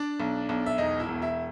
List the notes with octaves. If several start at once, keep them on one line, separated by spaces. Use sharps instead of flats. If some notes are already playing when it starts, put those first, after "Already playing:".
Already playing: D4 D5
B1
B1
E5
E1 D#4 D#5
E4 E5
E1
E4 E5